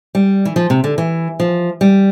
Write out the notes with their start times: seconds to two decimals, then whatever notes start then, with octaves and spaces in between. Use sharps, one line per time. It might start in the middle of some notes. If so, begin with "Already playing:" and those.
0.15 G3
0.45 E3
0.56 F3
0.70 C3
0.84 D3
0.98 E3
1.40 F3
1.81 G3